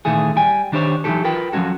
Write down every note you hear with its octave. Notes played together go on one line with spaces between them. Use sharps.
A#2 D#3 E3 A3 G#4
G3 G5 G#5
D#3 D4 G4 C5 C#5
E3 F#3 G3 D#4 G4 A4
F4 A#4 B4 G5
F3 F#3 A3 C#4 F#4 A4